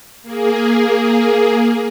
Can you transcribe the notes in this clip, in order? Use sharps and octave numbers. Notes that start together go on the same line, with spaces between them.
A#3 G#4